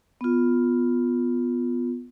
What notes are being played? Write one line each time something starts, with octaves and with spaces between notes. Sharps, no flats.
B3 F4